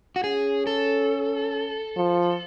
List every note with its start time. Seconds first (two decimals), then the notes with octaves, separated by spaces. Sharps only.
0.16 F#4
0.24 C#4 G#4
0.67 A4
1.97 F3